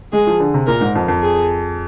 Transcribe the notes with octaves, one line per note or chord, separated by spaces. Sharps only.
G#3 G#4
F3
D3
C3
A#2 A#4
G#2
F2
F2
G#4